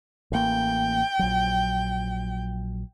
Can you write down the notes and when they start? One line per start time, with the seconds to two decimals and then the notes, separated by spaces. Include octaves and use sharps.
0.32 A1 A#3 G5
1.19 A#1 F#3